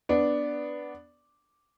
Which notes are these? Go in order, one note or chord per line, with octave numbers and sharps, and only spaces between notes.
B3 D4